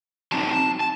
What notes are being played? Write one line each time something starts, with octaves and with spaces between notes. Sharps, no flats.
F#3 C4 D#4 A5
A5